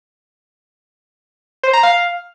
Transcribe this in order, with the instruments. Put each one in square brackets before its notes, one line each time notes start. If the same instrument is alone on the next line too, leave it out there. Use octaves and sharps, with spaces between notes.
[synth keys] C5
A#5
F5